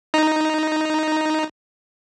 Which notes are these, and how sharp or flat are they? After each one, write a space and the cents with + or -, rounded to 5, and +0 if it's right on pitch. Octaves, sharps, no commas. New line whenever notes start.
D#4 +0 A#5 +0